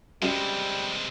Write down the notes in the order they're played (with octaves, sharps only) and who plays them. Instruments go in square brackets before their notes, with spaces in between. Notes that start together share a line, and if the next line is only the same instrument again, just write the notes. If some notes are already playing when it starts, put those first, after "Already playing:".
[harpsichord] F#2 [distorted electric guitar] C3 G#3 [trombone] G3